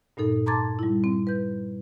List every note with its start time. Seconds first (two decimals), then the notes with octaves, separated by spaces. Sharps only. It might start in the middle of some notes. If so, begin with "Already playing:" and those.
0.17 G2 A#2 D#4 A4
0.46 A5 A#5 C6 D6 G#6 A6
0.79 G3 E4
1.04 C4
1.27 B4 G6